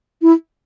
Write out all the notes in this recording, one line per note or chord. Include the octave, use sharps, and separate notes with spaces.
E4